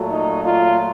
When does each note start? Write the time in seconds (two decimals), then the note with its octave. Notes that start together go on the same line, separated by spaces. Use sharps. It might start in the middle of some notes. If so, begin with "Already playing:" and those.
Already playing: A#2 F#3 A3
0.09 D#4
0.42 F4